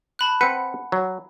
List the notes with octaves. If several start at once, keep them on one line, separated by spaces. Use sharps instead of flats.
A5 B5 F#6
C4 B4 F#5 C#7
F#3